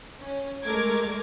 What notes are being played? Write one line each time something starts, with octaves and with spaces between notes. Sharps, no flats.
C#4
G#3 A3 A#4 D6 G#6